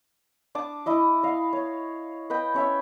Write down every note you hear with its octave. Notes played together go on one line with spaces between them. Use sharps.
D4 A5 D6 D#6
E4 D#5 D6
D#5 F5
C#5
B4 D#5 G5
C#4 C#5 E5